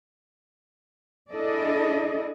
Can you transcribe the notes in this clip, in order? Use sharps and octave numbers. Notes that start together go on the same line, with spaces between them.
D4 E4 G#4 A4 D5 D#5